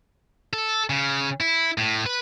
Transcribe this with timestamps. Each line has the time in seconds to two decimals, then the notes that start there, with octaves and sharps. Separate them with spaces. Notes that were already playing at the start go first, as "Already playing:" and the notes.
0.53 A4
0.90 C#3
1.40 E4
1.78 A2
2.06 B4